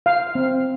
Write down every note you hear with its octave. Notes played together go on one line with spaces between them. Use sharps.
F5
C4